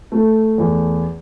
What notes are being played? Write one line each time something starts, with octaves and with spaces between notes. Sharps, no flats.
A3
E2